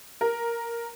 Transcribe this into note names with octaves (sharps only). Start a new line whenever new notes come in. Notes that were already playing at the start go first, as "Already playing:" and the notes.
A#4